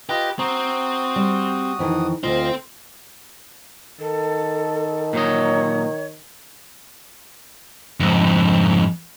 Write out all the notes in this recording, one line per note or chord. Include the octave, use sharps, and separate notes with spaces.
F4 G4 B4 D#5
C4 F#4 A#5 D#6
G3
F2 D#3 E3
D2 C4 F4 C5 D#5 F5
D#3 A4
A#2 F#3 C#5 D#5
F2 G#2